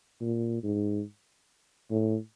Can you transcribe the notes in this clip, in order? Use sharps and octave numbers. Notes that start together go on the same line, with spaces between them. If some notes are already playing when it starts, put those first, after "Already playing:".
A#2
G#2
A2